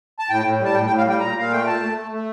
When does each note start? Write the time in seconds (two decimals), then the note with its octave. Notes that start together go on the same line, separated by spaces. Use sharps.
0.19 A5
0.30 A2 G5
0.45 A2
0.61 G3 A5
0.75 A2 G5
0.87 G5
0.90 A2
0.98 F5
1.06 G3 G5
1.20 A#2 A#5
1.36 A#2 F5
1.51 A3 G5
1.66 A3 A5
1.82 A3
1.96 A3
2.12 A3